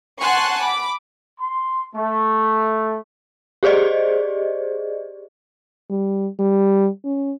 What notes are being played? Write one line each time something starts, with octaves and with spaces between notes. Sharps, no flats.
F#5 G#5 A5 C6 C#6 F#6
B5 D6
C6
A3
G4 G#4 C5 D5 D#5
G3
G3
C#4